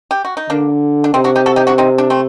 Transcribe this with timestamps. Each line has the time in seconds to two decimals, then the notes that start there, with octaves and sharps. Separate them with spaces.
0.11 G4
0.25 F#4
0.37 D#4
0.50 D3 A#3 D4
1.04 D4
1.14 C3 C4 D#4
1.24 D4 F#4
1.36 D#4 G4
1.46 F#4 A4
1.56 D#4 G4
1.67 D4 F#4
1.78 C4 D#4
1.98 D4
2.10 A3 C4